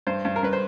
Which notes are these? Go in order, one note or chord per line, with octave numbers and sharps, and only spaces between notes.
G2 C5
G2
A#4
G2 B4
C5